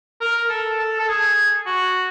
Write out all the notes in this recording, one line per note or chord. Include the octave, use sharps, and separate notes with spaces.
A#4
A4
A4
A4
G#4
F#4